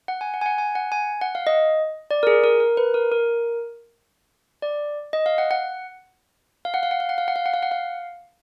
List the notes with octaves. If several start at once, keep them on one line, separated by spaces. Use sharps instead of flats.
F#5
G#5
F#5
G#5
F#5
G#5
F#5
G#5
F#5
F5
D#5
D5
A#4
G#4
A#4
A#4
B4
A#4
A#4
D5
D#5
F5
F#5
F#5
F5
F#5
F5
F#5
F5
F#5
F5
F#5
F5
F#5
F5
F#5
F5